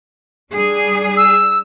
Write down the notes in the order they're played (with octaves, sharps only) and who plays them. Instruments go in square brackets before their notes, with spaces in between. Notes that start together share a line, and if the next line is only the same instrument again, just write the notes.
[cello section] G3 D4 G#4
[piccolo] E6